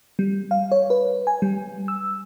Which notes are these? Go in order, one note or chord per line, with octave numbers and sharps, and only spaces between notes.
G3
F5
C#5
B4
G#5
G3
E6